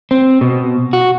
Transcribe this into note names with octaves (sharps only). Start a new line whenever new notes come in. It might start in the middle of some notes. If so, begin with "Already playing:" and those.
C4
B2
F#4